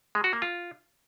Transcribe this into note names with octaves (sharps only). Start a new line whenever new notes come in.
G#3
F#4
A#3
F4